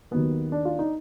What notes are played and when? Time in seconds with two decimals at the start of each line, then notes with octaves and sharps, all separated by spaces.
0.11 D#2 D#3 F#3 A#3 B3
0.52 D4
0.65 F4
0.79 D#4